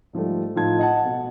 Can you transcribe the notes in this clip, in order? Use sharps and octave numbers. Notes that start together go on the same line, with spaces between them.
G#2 F3 G3 A3
A2 F3 D#4 F4 A5 G#6
D#5 F#5 A5
B2